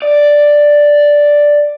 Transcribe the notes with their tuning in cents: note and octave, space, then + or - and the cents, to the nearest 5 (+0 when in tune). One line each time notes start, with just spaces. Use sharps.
D5 +0